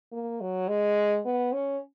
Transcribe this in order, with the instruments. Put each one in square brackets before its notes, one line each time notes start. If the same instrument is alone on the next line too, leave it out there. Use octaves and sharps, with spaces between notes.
[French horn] A#3
F#3
G#3
B3
C#4